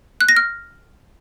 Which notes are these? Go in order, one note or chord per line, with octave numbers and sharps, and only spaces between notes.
F#6
A#6
F6